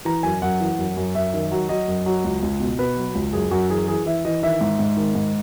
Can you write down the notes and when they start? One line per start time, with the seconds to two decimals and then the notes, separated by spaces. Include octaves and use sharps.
0.05 E3 A#5
0.23 F#2 G#5
0.42 F#2 F#5
0.61 E3
0.78 F#2
0.97 F#2
1.15 F#2 E5
1.34 D#3
1.51 F#3
1.69 F#3 D#5
1.88 F#2
2.06 F#3
2.24 C#2
2.43 C#2
2.60 B2
2.79 B2 B4
2.97 F#3
3.15 C#2
3.33 F#2 G#4
3.51 F#2 F#4
3.70 E3 G#4
3.88 E3 G#4
4.06 E3 E5
4.25 E3 D#5
4.42 D#3 E5
4.61 G#2
4.79 G#2
4.97 D#3
5.15 G#2